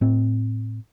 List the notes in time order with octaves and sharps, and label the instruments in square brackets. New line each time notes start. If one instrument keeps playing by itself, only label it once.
[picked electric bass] A2 C4